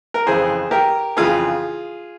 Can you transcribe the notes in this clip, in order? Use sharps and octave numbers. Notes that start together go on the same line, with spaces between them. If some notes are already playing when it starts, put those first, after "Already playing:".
A#4
F2 C#3 E3 G#4 C5
G4 A#4
F2 C#3 E3 F4 G#4